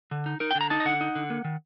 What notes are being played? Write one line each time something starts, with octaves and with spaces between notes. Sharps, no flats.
D3
D#4
D#4 A#4
D3 G5
A#5
D#4 A5
D#5
D3 F#5
D#4
D3
A#3
D#3